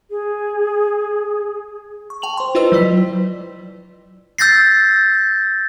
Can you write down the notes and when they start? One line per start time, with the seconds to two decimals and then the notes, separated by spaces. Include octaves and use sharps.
0.10 G#4
2.10 C#6
2.22 G5 A5 F7 F#7
2.37 C5 C6
2.55 E4 F4 B4 C5 D#5 E6
2.72 F#3 B4 D5 B6
4.38 E6 G6 A6 A#6 C7